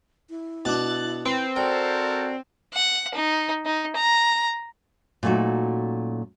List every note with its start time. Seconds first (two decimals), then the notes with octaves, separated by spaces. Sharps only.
0.30 E4
0.65 B2 D4 F#6 A6
1.25 C4 B4
1.56 F#4 A4 A#4 D5 G5
2.73 F#5
3.15 D#4
3.65 D#4
3.96 A#5
5.23 A#2 F#3 A3 C#4 D#4 F#4